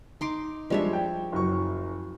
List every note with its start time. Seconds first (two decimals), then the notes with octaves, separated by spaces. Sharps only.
0.21 D#4 C6 D6
0.70 F3 G3 G#3 D4 C#5 E5
0.93 G5
1.32 F#1 F#3 C#6